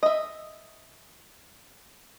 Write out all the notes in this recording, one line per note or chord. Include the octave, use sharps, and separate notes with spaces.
D#5 E5